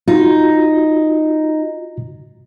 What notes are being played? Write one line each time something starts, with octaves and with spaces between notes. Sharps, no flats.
D#4 F4 F#4